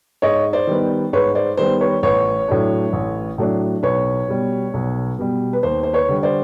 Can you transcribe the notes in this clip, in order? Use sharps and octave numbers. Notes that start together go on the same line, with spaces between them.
G#2 C#5 D#5
C5 D5
D#3 G3 B3
G#2 B4 C#5
C5 D5
D#3 G3 B3 C5
B4 C#5
A1 B4 C#5
A2 F#3 A3 D4
A1
A2 F#3 A3 D4
B1 B4 C#5
B2 G3
B1
B2 G3
B4
D#2 C5
C5
B4 C#5
D3 G3
C5 D5